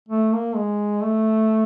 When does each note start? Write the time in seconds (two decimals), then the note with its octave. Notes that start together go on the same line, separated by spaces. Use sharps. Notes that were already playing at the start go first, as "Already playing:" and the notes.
0.09 A3
0.33 A#3
0.56 G#3
1.03 A3